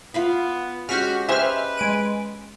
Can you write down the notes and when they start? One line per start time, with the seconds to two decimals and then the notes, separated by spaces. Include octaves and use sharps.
0.14 B3 F4 F5 B5
0.89 G#3 C#4 F#4 G4 F6 B6
1.29 G4 G#4 B4 C5 D#5 E5 F6
1.77 G#3 D7 D#7